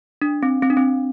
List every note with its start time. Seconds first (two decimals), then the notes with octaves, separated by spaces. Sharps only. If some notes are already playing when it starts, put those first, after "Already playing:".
0.22 D4
0.43 C4
0.63 C4
0.70 D4
0.77 C4